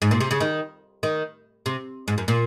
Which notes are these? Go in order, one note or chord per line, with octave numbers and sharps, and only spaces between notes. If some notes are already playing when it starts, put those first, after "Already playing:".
G#2
A#2
C3
C#3
D#3
D#3
C3
G#2
F#2
A#2